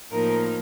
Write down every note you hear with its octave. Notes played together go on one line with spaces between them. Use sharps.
A2 F3 A#3 D#4 A#4